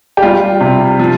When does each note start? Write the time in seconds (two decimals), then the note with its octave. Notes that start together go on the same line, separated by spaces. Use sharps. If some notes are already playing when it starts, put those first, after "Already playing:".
0.17 G4
0.22 G3 F4
0.61 C3
0.99 F3